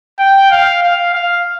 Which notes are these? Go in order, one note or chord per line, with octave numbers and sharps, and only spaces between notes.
G5
F5
F5
F5